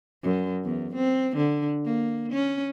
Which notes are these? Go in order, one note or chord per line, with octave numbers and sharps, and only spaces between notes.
F#2
E2
C4
D3
A#3
C#4